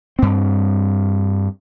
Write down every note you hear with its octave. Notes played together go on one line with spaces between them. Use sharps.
G2 C4